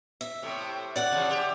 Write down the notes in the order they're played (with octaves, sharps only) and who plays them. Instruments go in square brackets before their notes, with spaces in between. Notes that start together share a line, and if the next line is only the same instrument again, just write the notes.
[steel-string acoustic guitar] E5
[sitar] A2 C3
[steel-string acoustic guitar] D5 F#5
[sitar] C3 F3
G4 E5